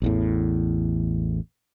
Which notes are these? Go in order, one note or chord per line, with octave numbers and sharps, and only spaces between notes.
A1 E2 A2